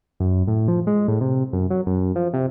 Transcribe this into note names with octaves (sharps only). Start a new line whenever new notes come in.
F#2
A2
F3
G#3
A2
C3
F#2
F#3
F#2
F3
C3